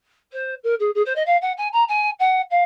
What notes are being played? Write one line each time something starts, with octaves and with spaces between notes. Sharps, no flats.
C5
A#4
G#4
G#4
C5
D#5
F5
F#5
G#5
A#5
G#5
F#5
F5